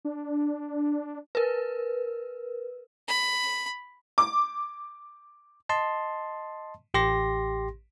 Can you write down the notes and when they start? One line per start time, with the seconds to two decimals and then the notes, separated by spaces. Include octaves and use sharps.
0.05 D4
1.35 A#4 B4
3.08 B5
4.18 D6
5.69 D#5 A5 C6
6.94 A1 G4 C6 A#6